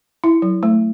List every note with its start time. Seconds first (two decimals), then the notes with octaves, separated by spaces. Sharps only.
0.24 E4
0.42 F#3
0.63 A3